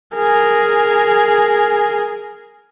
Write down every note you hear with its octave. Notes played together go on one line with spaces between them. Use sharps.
G#4 A#4